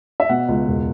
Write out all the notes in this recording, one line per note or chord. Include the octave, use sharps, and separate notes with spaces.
E5
B2 F#5
C#2
E1